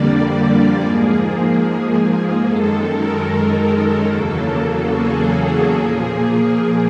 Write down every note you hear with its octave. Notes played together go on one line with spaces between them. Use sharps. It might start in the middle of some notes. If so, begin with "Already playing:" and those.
Already playing: F2 D3 G3 A#3 D5
G#2 F3 A#3 G#4
F#2 D#3 G#3 A4
A#4
A4
E2 C#3 F#3 A#3
G#4
A#2 F3 A#3
G#4